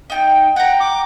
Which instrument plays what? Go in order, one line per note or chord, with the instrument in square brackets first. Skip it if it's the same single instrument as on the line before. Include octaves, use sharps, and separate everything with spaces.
[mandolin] D#4 G5
[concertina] F#5 [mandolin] G5 A#5
[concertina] D6